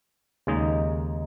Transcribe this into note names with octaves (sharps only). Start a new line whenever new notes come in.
D#2 C#3 G#3 D#4